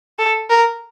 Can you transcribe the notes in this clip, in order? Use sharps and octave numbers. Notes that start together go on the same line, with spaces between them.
A4
A#4